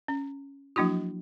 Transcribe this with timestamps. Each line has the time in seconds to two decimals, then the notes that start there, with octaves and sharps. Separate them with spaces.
0.08 C#4
0.76 F3 F#3 A#3 D4 E4 F#4